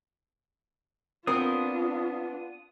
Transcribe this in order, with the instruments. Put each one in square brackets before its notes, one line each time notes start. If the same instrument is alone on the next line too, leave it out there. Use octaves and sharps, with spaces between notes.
[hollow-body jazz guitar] B3 C4 A#4 [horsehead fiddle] D4 F4 [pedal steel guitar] D#6